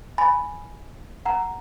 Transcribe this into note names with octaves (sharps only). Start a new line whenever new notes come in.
G#5 B5
F#5 A#5